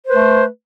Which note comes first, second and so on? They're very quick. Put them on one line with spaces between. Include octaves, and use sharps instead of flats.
C5 B4 A3